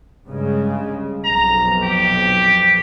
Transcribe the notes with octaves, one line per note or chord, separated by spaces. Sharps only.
G2 C#3 G#3
B1 F2 A#5
G4